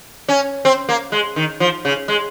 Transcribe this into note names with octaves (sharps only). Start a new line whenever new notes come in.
C#4
C4
A#3
G#3
D#3
F3
C#3
G#3